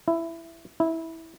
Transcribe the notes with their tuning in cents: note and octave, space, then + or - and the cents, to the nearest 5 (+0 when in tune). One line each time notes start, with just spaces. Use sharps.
E4 +10
E4 -15